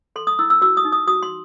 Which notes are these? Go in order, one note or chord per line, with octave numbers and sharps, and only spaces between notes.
A4 C6
D#6
E4 E6
E6
F#4 E6
D#6
D#4
D#6
F#4 D#6
C6